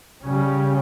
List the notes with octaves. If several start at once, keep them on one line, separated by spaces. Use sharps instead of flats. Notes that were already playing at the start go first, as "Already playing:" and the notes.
C#3 G3 C#4